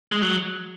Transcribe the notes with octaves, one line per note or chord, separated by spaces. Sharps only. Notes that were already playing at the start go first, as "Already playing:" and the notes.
G#3
F#3